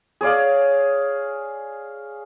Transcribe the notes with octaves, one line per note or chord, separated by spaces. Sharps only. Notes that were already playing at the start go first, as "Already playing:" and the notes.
G#4 C#5 D5 F5